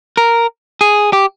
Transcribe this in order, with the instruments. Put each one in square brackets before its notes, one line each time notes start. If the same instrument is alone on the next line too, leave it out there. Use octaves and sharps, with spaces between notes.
[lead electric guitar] A#4
G#4
G4